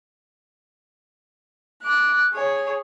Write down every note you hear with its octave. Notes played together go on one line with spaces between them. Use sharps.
D6 F#6
G#4 C#5